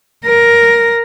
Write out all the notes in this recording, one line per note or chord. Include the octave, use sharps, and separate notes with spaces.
A#4